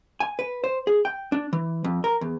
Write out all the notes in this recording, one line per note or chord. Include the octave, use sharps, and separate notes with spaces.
G#5
B4
C5
G#4
G5
D4
E3
F2
A#4
E2